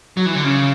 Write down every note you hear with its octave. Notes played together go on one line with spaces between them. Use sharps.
F#3
E3
D3
C#3